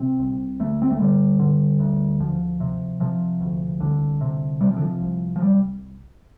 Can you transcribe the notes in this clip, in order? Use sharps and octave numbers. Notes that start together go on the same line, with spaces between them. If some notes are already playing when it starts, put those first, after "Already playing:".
Already playing: C3 C4
C2
D2 A3
C4
A3
D3 G3
D3
D2
D2 F3
C3
C3 F3
D2
C2 D3
C3
C3 G3
F3
D3
F3
C2
F3
G3